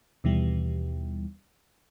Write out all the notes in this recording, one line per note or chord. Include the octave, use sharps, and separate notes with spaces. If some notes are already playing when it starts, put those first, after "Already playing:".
D#2 B2 E3 G3